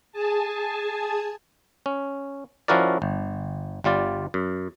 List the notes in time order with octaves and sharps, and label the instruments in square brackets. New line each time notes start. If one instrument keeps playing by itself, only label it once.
[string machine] G#4 G#5 A5
[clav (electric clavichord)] C#4
F3 C#4 E4 F#4 A#4 D5
G1
G1 G3 F4 D5
F#2